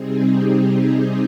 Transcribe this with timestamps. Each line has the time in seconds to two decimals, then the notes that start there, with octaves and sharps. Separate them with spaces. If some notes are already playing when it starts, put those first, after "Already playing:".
Already playing: C3 G3 C4 D#4 G#4
0.28 G4
0.67 G#4